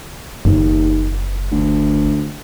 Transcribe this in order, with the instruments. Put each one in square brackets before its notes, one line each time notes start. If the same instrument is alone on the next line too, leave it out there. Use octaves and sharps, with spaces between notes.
[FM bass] F#1 [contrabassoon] D#2
[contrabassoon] D2